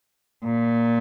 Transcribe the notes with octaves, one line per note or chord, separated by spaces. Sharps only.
A#2